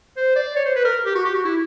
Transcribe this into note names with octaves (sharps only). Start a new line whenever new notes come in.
C5
D5
C#5
C5
B4
A#4
G4
F#4
G4
F#4
E4